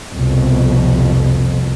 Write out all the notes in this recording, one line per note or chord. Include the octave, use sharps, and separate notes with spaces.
C2 F2 B2